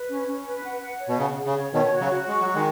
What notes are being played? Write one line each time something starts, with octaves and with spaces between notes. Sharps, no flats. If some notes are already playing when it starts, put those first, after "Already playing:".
Already playing: B4
C#4
C#4
B4
F#5
F#5
C#5
B2
C#3 F#5
G#4
C#3
C#5
B2 D#3 C#5
F#4
C#3 F#3
F#4
G#3 C#6
F#3 F#4
D#3 G#3